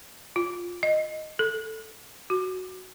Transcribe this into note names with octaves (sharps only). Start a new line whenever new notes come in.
F4
D#5
A4
F#4